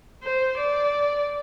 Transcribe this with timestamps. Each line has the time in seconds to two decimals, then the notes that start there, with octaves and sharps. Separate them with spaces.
0.23 C5
0.58 D5